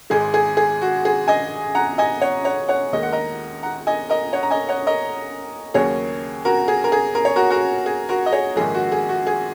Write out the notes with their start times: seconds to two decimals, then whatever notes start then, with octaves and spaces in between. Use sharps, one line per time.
0.10 G#1 G#2 G#3 G#4
0.34 G#4
0.57 G#4
0.81 F#4
1.05 G#4
1.28 D#5 G#5
1.75 F#5 A#5
1.98 D#5 G#5
2.21 C#5 F#5
2.45 C#5 F#5
2.68 C#5 F#5
2.93 D#2 D#3 G#3 D#5
3.03 F#5
3.12 A#4 D#5
3.63 F#5 A#5
3.87 D#5 G#5
4.09 A#4 D#5
4.33 C#5 F#5
4.43 A#5
4.51 D#5 G#5
4.68 C#5 F#5
4.86 A#4 D#5
5.74 D#2 C#3 F#3 A#3 G#4 C#5
6.45 F#4 A#4
6.68 G#4
6.84 A#4
6.92 G#4
7.15 A#4
7.25 C#5
7.36 F#4 A#4
7.50 F#4 A#4
7.86 G#4
8.09 F#4 A#4
8.26 D#5
8.32 G#4 C#5
8.56 A#1 G#2 D#3 G#4
8.74 F#4
8.92 G#4
9.09 F#4
9.27 G#4